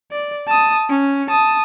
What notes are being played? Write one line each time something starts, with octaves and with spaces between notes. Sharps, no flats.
D5
A5 D#6
C#4
A5 D#6